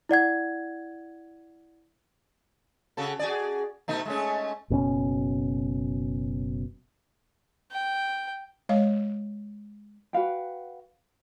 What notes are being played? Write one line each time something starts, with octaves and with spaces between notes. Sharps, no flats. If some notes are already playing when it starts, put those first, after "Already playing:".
E4 D5 F#5 G#6
C#3 F#4 A4
F#4 G#4 D5
B2 A3 D#4
G#3 A3 C#4
F#1 B2 C4 C#4
G5
G#3 C#5 F5
F#4 B4 F5 G5